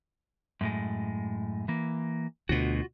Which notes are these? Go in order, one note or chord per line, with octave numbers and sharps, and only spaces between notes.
F#2 A2 G#3
E3 A#3
D2 B2 F4 F#4